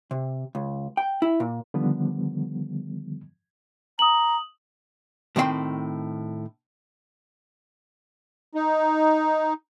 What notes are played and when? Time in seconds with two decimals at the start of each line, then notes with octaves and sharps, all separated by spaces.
0.11 C3
0.55 C#2
0.97 G5
1.22 E4
1.40 A#2
1.74 D3 D#3 F3 G3 B3
3.99 A#5 D#6 F#7
5.36 A2 D#3 C4 E5 G5 C6
8.55 D#4